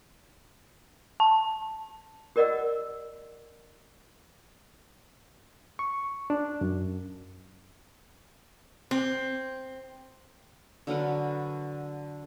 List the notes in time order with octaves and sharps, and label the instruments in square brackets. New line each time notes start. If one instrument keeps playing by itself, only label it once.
[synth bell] A5
[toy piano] G4 A#4 D5 D#5 F#5 E6
[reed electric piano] C#6
D4
F#2
[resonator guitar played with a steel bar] C4
[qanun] D3 F#3 A#4 B4